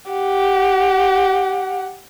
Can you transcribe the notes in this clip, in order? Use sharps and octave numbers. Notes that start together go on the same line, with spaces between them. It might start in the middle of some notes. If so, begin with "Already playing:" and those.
G4 F#5